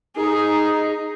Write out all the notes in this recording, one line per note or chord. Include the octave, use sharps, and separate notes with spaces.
D#4 G#4